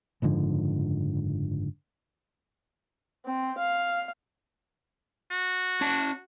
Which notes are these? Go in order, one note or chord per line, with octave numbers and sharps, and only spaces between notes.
F#1 G#2 D3 F3
C4
F5
F#4
C#4 A5